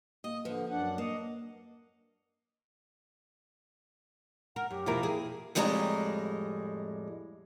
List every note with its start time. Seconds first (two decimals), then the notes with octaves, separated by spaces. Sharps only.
0.24 A#3 D#5
0.45 D3 F3 B4
0.70 F#2 D4 F#5
0.98 A#3 D#5 C#7
4.56 A#4 F#5
4.71 F#2 G4
4.86 F2 B2 F3 A#3 E4 A#4
5.03 G#4
5.55 F2 A2 G3 G#3 G#5 A#5